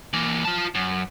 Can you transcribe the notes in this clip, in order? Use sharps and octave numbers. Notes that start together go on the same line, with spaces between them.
E3 A#3
F4 A5
F#2